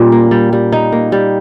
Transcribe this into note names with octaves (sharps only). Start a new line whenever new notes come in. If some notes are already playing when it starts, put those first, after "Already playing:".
Already playing: A#2 G3 C#4
A#3
G3
G3
D#4
A#3
G3